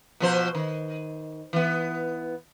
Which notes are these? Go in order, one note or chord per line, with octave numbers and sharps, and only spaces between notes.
B2 F3 C5
D#3
E3 B3